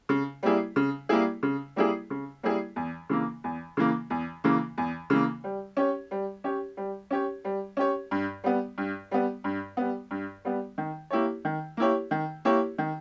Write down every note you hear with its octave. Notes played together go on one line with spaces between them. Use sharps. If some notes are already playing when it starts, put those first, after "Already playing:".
C#3
G3 A#3 E4 G#4
C#3
G3 A#3 E4 G#4
C#3
G3 A#3 E4 G#4
C#3
G3 A#3 E4 G#4
E2
C#3 E3 A#3
E2
C#3 E3 A#3
E2
C#3 E3 A#3
E2
C#3 E3 A#3
G3
C#4 G4 C#5
G3
C#4 G4 C#5
G3
C#4 G4 C#5
G3
C#4 G4 C#5
G2
G3 B3
G2
G3 B3
G2
G3 B3
G2
G3 B3
D#3
A#3 E4 G4 C#5
D#3
A#3 E4 G4 C#5
D#3
A#3 E4 G4 C#5
D#3